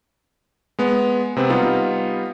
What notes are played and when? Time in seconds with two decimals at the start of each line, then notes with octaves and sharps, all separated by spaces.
0.79 G#3 B3
1.36 C3 B3 C4
1.50 G3 B3 D#4 F4